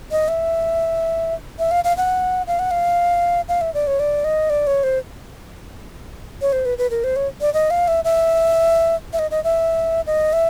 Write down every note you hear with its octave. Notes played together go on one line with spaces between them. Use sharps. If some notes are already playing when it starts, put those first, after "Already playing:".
D#5
E5
E5
F5
F5
F#5
F5
F#5
F5
F5
E5
D5
C#5
D5
D#5
D5
C#5
C5
C#5
C5
B4
B4
A#4
C5
C#5
D5
D#5
F5
E5
E5
E5
D#5
D#5
E5
D#5
E5